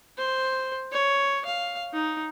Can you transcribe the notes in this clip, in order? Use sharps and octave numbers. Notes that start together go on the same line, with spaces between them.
C5
C#5
F5
D#4